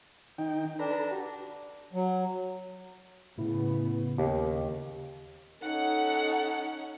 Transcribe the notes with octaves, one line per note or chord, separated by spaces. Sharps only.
D#3 D#4 G5
D4 A4 B4 A#5
F#4 G4
F#3
A2 C#3 B3 E4
D#2 C#3 G4
C#4 D#4 A4 F#5